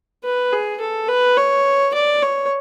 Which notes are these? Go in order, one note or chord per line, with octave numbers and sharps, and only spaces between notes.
B4
G#4
A4
B4
C#5
D5
C#5